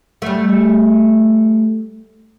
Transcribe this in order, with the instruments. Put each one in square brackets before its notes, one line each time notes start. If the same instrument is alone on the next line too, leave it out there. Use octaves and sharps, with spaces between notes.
[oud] G3 A3